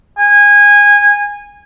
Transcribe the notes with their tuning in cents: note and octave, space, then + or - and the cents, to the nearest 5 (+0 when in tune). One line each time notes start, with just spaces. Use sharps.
G#5 -20